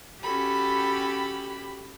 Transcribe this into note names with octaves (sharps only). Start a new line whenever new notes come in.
C#4 F#4 G4 A4 B5